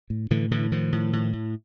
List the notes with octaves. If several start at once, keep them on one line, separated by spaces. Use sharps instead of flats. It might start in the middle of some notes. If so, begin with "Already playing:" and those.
A2
A2 D3 E3
A2 D3 E3
A2 D#3 F3
A2
A2
A2